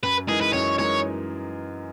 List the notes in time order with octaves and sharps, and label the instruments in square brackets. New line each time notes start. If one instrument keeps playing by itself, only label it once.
[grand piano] F#2 [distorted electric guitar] B4
[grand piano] E3 G#3 D#4 A#4 [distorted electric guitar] G#4
[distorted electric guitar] B4
[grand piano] F#2 [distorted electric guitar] C#5
[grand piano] E3 G#3 D#4 A#4 [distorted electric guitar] C#5